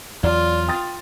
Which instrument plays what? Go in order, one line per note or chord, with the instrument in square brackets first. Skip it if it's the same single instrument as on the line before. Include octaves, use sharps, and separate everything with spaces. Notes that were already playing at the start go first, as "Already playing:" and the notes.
[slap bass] E2 F#3 [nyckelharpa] F4 [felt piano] D5
[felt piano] G5 D#6 A6